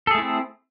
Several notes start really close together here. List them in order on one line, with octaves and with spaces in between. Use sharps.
A4 G#4 A3 E4 C4